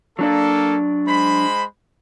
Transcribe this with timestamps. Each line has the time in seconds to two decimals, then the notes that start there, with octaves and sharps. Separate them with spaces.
0.19 F#3 A#3 D4 A4 D5
1.07 G#3 C5 B5